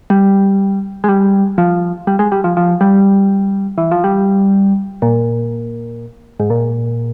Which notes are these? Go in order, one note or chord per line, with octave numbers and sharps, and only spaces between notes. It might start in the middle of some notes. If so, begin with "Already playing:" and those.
G3
G#3
G3
F3
G3
G#3
G3
F3
F3
G3
E3
F3
G3
A#2
G#2
A#2